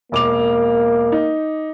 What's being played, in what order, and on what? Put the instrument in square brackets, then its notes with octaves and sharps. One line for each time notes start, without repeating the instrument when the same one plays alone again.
[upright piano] E1 D6 F7 [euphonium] A#3
[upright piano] D#4